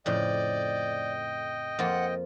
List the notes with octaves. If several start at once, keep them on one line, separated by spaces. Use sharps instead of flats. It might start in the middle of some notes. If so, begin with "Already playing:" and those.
F2 A2 C#3 D5 D#5 G5
F2 A#3 F4 F#5